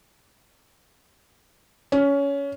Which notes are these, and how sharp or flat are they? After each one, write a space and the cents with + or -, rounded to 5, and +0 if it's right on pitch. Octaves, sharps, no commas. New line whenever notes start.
C#4 +20